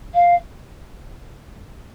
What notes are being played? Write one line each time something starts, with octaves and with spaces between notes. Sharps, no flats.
F5